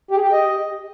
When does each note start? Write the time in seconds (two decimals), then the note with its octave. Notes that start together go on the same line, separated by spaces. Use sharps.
0.11 G4
0.16 G#4
0.22 G4
0.27 G5
0.32 D#5